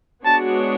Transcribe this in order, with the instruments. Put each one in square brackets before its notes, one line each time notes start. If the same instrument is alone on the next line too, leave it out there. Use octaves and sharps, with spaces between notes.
[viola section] G#3 B3 D4 F#4 C#5 [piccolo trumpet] A5